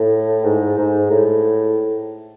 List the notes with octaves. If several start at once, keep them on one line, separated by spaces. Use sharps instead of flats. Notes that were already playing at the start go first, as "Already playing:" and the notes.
Already playing: A2
G#2
G#2
A2